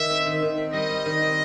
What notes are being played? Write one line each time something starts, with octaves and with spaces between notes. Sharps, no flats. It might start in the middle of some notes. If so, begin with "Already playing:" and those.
Already playing: D#3 E5
C4
D#3
D#3
C4
G3 D#5
G3
D#3
C4